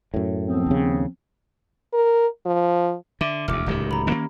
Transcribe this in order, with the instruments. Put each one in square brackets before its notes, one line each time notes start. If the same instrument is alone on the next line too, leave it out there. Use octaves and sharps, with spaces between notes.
[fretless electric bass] F#2 A2
[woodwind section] F3 B3 C4
[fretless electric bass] D#2 C#3
[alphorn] A#4
F3
[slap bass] D3 [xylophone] E5 D6
[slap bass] E1 D2 [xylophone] D6 F6
[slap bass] D1 C#2 D#3 [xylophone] G4
[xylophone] A#5 B5
[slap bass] D#3 A#3 C#4